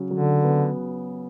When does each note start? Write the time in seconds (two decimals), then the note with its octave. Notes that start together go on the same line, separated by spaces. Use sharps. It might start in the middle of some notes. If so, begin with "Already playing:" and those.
Already playing: C#3 F#3
0.10 D3 F#3
0.44 B3